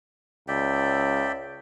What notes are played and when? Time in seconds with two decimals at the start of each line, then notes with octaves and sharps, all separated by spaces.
0.48 C#2 D5 E5 G5